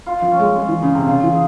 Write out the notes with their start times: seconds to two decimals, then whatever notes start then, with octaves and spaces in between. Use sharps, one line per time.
0.06 F4
0.22 F3
0.32 C#4
0.39 G#3
0.56 G#3 C#4
0.69 E3
0.82 C#3 G#4
0.95 C3
1.07 C#3 F4
1.23 E3
1.32 G#4